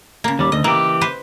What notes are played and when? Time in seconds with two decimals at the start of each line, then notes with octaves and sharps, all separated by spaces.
0.24 C#3 A#3
0.39 D#2 G3
0.52 D2 D#5
0.64 E3 A#3 G4
1.01 B4 C5